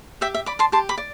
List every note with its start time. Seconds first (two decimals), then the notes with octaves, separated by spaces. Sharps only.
0.21 G4 E5 G5
0.34 E5
0.46 D5 B5 D6
0.59 A5 C6
0.72 G4 A5 C6
0.89 B5 D6
0.98 D5